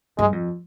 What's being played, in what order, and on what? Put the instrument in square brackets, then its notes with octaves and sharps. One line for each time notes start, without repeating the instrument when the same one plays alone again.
[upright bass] G2 [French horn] G#3
[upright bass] F2